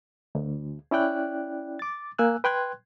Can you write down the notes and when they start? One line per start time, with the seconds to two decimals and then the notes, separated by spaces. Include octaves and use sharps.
0.35 D2
0.91 C#4 E4 D5 G5 F#6
1.79 D6 A6
2.19 A#3 G#5 E6 F#6
2.44 B4 G5 C6 F#6 G#6